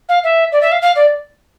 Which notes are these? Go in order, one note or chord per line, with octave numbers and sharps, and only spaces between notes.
F5
E5
D5
E5
F5
F5
D5